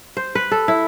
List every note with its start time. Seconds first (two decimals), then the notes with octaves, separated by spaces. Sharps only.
0.17 C5
0.35 B4
0.51 A4
0.68 E4